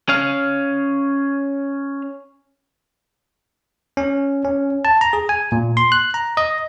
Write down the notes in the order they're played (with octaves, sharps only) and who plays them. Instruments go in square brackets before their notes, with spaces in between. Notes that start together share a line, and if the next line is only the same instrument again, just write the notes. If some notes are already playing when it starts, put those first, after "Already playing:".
[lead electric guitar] C#4 F5
[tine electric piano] C#4
C#4
A5
A#5
G#4
G#5
A#2
C6
F#6
A#5
D#5